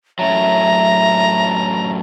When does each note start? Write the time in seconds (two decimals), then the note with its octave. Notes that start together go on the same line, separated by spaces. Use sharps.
0.19 F#2 A2 F#3 E5 A#5